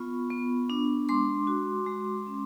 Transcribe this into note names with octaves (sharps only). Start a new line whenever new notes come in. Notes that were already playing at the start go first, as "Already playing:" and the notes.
Already playing: B3 F4 B5 C#6
B3
D4
G#3 C6 D6
F#4
G#3
C#4